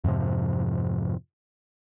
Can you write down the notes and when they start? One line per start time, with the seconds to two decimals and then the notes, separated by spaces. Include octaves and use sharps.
0.04 F2 G#2 C3 F3